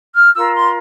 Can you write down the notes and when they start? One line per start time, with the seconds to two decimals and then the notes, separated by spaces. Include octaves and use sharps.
0.13 F6
0.33 F4 A#4 E6
0.53 C6